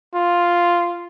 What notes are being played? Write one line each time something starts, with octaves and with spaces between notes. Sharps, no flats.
F4